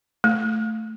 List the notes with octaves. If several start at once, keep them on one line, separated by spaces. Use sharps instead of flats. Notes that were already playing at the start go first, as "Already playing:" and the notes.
A3